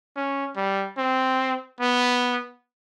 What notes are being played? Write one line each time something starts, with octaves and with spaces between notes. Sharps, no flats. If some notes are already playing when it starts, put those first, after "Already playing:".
C#4
G3
C4
B3